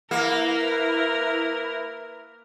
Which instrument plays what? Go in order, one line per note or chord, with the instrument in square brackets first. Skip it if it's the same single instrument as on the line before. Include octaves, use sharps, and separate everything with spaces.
[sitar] A#3 [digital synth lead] E4 [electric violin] A#4 [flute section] B4 E5